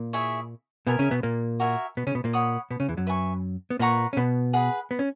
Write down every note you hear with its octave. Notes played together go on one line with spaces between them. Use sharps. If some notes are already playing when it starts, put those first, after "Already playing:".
Already playing: A#2 A#3
E4 G#4 C#5 E5
B2 B3 A#4 E5 G#5
C#3 C#4
B2 B3
A#2 A#3
F#4 A#4 E5 G#5
B2 B3
C#3 C#4
B2 B3
A#2 A#3
C#5 F#5 B5 D#6
B2 B3
C#3 C#4
E2 E3
F#2 F#3
B4 E5 G#5 C#6
B3
A#2 A#3 B4 F#5 A#5 C#6
C#4
B2 B3
G#4 B4 F#5 B5
B3
C#4